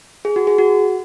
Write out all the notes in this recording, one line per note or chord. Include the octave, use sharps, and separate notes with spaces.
G#4
F#4
G#4
F#4